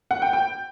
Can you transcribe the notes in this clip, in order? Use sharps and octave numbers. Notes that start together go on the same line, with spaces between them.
F#5
G5
G5